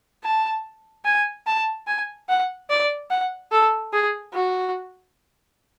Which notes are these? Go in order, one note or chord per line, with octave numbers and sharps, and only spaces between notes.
A5
G#5
A5
G#5
F#5
D5
F#5
A4
G#4
F#4